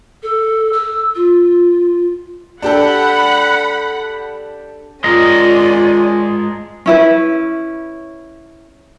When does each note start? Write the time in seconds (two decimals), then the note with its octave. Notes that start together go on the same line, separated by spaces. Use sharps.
0.23 A4
0.73 E6
1.15 F4
2.62 D4 G4 A4 F#5 B5
5.04 G#3 C#4 F4 A#4 D5 D#5
6.86 C#4 E4 B4